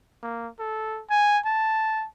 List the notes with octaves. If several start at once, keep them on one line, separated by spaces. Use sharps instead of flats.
A#3
A4
G#5
A5